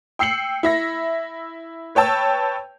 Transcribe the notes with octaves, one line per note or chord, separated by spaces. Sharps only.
G5 E6 C7 C#7 F#7
E4 E5 A#6
B4 C#5 G5 A5 E6